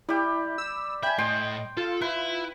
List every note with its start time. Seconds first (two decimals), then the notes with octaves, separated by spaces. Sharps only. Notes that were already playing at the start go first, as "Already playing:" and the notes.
0.09 G3 E4 G4
0.58 E6
1.03 E5 G5 G#5 B5
1.18 A2 D#5 G5 C6
1.77 F4 A4
2.01 E4 B4